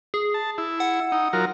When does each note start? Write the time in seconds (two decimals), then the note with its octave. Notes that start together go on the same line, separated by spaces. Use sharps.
0.14 G#4
0.34 A5
0.58 E4
0.80 F#5
1.12 D#4
1.33 F#3 F4 A#4